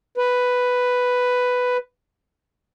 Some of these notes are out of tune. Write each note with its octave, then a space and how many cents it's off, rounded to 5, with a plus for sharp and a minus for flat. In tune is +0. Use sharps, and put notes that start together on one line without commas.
B4 +5